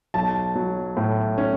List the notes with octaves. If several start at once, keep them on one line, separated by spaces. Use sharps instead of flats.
B1 A5
F#3
A2
C#4